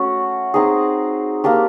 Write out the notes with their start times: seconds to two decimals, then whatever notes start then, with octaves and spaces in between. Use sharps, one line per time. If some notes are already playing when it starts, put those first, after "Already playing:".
Already playing: A3 C#4 F#4
0.54 C4 D#4 G#4
1.44 A#3 D4 G4